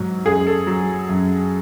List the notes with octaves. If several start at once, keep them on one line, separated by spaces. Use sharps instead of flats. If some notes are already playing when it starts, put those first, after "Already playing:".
Already playing: G#2 F#3
F#2 G#4
A4
F#3
F#2